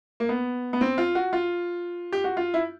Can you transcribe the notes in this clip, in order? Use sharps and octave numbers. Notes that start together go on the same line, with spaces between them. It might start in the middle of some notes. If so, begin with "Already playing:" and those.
A#3
B3
B3
C4
F4
F#4
F4
G4
F#4
F4
E4